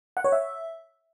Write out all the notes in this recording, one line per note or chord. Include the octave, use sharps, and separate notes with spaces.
F#5
C#5
E5